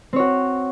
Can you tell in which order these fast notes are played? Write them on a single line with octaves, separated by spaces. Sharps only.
C4 C#5 F#4